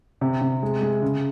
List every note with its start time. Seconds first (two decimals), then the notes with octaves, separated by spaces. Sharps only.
0.21 C3
0.41 C3
0.63 G#3
0.82 G#3
1.02 C#3